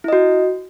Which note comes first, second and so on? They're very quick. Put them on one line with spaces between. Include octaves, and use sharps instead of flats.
E4 D#5 F#4